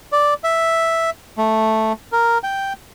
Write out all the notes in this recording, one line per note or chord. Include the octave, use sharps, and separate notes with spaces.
D5
E5
A3
A#4
G5